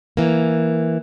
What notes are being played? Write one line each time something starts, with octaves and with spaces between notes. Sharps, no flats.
E3 A#3